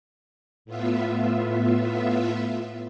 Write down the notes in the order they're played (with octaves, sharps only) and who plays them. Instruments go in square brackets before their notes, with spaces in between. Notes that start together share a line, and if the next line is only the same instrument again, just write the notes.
[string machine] A2 B3 F4 E5